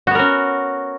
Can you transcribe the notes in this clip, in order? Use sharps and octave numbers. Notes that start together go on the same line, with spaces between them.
B3 C#4 F#4 A#4